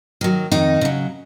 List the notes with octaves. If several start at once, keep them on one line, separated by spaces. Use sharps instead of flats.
D#3 F#3
F2 D#3 D#4
C#3 F#3